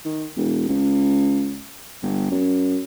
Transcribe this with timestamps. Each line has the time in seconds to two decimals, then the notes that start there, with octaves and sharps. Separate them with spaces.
0.05 D#3
0.37 E1
0.69 C#2
2.03 G1
2.31 F#2